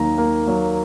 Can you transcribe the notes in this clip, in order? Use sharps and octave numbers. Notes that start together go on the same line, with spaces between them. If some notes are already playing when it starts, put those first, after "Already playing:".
Already playing: D#2 D#3 F#3 A#3 A#5
A#3
F#3